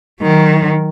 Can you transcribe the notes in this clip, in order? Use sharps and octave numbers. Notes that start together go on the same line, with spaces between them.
D#3 F#3